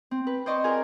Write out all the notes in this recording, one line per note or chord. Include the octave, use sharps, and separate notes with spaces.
C4
B4
C5 D5 D#5 C6 C#6
F4 G#4 A#4 G#5